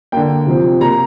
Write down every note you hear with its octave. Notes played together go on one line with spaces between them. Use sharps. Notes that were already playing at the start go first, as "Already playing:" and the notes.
D3 A#3 G5
C3 F3 C4
C3 A#3 A#5